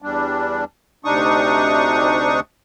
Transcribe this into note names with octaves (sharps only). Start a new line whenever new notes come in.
E2 G3 D4
D2 C3 D4 D#4 C#6 D#6